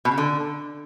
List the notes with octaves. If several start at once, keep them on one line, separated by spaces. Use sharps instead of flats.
B2
C#3
D3